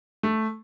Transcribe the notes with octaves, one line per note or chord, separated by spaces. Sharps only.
A3